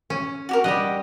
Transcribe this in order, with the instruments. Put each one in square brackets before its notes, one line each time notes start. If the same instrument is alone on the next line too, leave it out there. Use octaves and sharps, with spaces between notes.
[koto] C#4
[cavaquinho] F#4 G4 A#4
[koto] G3 D#5 [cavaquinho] G4 F#5